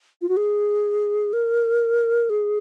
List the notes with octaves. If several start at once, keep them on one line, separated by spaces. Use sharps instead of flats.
F4
F#4
G#4
A#4
G#4